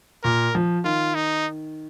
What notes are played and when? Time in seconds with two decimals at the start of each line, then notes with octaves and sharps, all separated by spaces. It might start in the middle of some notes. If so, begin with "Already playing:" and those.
0.23 A#2 A#4
0.55 F3
0.84 D#3 F4
1.15 D#4